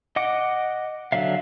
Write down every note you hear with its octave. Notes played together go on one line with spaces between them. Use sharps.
D#5 F#5 D6
D3 F#3 E5 F5